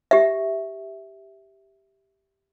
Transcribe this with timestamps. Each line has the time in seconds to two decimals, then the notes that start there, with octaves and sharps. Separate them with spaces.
0.11 G4 E5